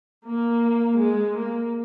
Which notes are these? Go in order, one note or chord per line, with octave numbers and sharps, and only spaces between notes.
A#3
G#3
A#3